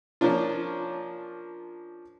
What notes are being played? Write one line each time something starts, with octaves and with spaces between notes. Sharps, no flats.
F3 A#3 C#4 D4 F4